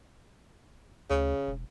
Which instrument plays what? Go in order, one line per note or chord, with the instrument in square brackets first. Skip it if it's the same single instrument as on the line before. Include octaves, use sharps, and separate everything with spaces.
[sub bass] D2 [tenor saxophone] C#3
[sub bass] E1